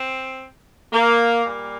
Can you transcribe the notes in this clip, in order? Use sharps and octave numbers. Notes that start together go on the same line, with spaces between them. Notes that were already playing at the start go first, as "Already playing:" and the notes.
Already playing: C4
A#3
A#2 G3 A#3